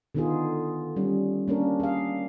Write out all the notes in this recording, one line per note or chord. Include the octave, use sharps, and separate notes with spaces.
D3 D#3 B3 D#4 F4 G#4
G3 C#4
A#3 C#4 D4 A#4
G#4 F5